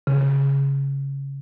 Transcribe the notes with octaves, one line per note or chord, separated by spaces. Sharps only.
C#3